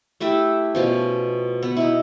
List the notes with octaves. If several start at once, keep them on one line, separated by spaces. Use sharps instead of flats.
A3 E4 G4 E5
B2 F3 C#4
B3
D#4 E4